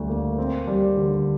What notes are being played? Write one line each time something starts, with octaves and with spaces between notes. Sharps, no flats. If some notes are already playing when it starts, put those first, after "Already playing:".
Already playing: D2 D3 G3
A#3
C4
G3
D3